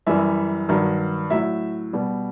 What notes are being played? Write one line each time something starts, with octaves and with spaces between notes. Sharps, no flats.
F#2 E3 G3 E5
G2 D#3 F#3
A2 F#3 E5
B2 G3